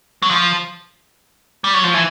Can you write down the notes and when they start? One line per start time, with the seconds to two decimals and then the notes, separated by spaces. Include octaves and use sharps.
0.22 F#3
0.31 F3
1.64 G3
1.74 F#3
1.84 F3
1.94 E3